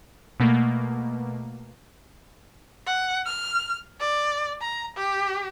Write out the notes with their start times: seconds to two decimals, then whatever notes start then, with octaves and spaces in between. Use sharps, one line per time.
0.40 B2 A3 A#3
2.86 F#5
3.26 F6
4.00 D5
4.61 A#5
4.96 G4